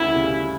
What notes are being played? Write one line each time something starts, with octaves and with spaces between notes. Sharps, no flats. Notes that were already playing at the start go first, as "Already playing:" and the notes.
Already playing: D2 C#3 G3 E4
C#3 G3